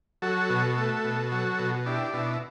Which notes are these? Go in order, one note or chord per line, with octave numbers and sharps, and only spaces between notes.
F#3 F#4 A4
B2
A3
B2
F#3
B2
D4 E4 G4
B2 E4